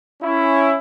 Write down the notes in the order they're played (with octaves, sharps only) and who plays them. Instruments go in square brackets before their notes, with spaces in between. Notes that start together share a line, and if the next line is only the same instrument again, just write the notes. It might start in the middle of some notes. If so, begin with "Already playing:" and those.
[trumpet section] C#4 E4